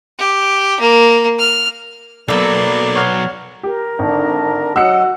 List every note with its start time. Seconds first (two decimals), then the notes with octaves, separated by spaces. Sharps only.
0.19 G4
0.80 A#3
1.39 F6
2.28 B1 F#3 A#3 B3 A4 D5
2.96 C#5 F#5 F6
3.63 G4 A#4
3.99 G#1 D3 D4
4.76 F#3 F#4 D#5 F#5 E6 F#6 C#7